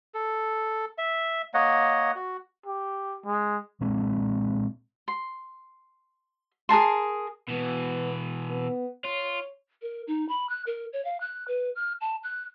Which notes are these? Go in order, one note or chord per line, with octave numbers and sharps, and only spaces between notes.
A4
E5
A#3 C#5 D#5 F#5
F#4
G4
G#3
A#2 G#3 C4 D4
C6
G#4 A#4 A5 C6
B2 E3 B3
B3
F4 C#5
A#4
D#4
B5
F#6
A#4
C#5
F5
F#6
B4
F6
A5
F#6